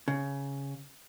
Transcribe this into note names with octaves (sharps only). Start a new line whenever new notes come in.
C#3